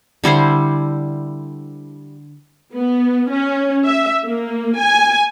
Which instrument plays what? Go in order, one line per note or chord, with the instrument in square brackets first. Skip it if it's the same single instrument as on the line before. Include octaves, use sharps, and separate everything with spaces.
[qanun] D3 G3 E4 C5
[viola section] B3
C#4
E5
A#3
G#5